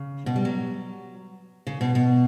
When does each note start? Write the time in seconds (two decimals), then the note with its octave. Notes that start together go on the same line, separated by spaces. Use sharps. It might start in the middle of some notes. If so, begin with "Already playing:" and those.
Already playing: C#3
0.26 B2
0.36 G3
0.45 F#3
1.67 C#3
1.81 B2
1.95 B2